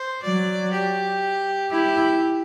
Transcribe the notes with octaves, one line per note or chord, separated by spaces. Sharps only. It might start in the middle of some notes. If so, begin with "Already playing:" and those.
Already playing: C5
F#3 D5
G4
E4 G4